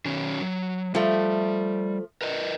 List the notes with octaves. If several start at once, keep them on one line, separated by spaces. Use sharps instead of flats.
D#3 F#3 C#4
F#3
F3 G3 A3
A#4 B4 D#5